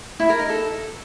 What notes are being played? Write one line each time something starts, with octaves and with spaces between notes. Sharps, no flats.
E4
A#4
D#4
A4